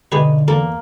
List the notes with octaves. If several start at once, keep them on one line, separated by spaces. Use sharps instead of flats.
B1 D3 G4 G#4 B4 D#5
E2 A#3 A4